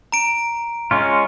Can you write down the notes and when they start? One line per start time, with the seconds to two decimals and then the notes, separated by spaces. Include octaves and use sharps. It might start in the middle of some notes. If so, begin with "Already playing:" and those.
0.12 A#5 D7
0.91 G#3 C#4 F4